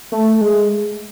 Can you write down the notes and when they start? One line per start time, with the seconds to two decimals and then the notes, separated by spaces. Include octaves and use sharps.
0.12 A3
0.41 G#3